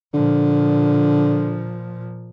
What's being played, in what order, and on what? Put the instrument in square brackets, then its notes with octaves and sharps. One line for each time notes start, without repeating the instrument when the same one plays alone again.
[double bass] A#2 F3 [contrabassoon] D3